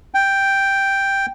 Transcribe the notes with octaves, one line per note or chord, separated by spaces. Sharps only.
G5